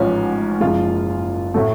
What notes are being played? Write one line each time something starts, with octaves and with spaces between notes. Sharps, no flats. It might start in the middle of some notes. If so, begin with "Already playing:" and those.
Already playing: A1 G#2 F3 C#4
F#1 F#2 F3 G#3 F4
A2 F#3 A3